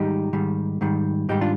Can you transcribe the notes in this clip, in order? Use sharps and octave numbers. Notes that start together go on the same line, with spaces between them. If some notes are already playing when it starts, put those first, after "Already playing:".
Already playing: G#2 D#3 G3 D#4 G4
G#2 D#3 G3
G#2 D#3 G3
G#2 D#3 G3 D#4 G4
D4 F4